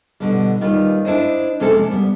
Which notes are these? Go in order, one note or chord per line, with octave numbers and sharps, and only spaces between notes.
B2 D3 G3
D#2 D#3 G3 F4 B4
D4 E4 C5 D#5
F2 C3 G#3 A#3 C#4 A4
G3 B3